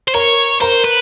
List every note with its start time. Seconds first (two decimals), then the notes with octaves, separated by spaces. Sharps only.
0.08 C5
0.14 A#4 C#5
0.61 A#4 C5
0.85 B4